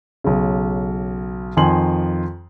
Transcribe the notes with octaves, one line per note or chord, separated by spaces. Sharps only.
B1 C#3
F2 D#3 G#5 C6 F#7